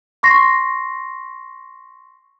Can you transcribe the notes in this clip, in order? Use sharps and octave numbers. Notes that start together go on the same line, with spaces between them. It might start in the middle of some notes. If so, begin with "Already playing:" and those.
C6 C#6 A#6 C7